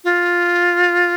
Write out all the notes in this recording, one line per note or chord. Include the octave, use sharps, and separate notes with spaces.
F4